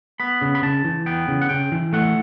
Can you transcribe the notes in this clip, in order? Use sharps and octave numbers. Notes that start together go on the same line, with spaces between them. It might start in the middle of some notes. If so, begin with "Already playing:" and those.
B3 B5
C#3
B5
C#3 A5
E3
B3 G5
C#3
F#5
C#3 G5
E3
A3 F#5